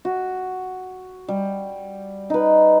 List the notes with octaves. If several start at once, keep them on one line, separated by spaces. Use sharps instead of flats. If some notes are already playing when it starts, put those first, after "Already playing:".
F#4
G3
D#4 B4